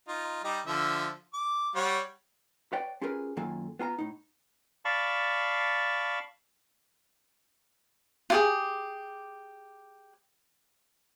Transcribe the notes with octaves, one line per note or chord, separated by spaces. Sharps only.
D#4 F4
G3 D#4 G4
D3 F3 E5
D6
G3 C#5 F#5
B4 C#5 D5 G5
C#4 F4 G4 G#4 A#4 B4
F#2 D#3 A#3 F4 A4 G#5
B3 F4 G#5 A#5
A2 D#4
D5 F5 A5 B5 C#6
F4 G4 G#4